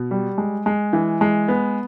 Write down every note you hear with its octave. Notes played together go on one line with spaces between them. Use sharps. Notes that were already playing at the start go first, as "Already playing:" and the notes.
Already playing: B2
G3
G#3
G#3
E3
G#3
B3